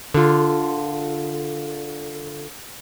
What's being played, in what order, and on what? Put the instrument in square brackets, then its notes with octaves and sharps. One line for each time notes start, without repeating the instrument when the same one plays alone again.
[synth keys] D3 F4